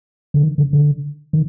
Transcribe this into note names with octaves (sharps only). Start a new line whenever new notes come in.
D3
D#3
D3
D3
D#3